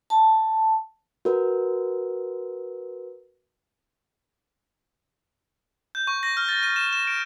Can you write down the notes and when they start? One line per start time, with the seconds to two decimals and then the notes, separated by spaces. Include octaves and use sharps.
0.10 A5
1.25 F#4 A#4 B4
5.95 G6
6.07 C#6
6.23 A#6
6.37 F6
6.49 A6
6.63 D#7
6.76 E7
6.93 E7
7.07 D7